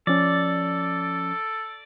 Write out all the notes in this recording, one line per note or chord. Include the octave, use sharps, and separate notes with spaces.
F3 C#4 A4 D5